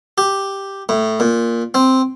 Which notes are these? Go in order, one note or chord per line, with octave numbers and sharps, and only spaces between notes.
G4
A2
A#2
C4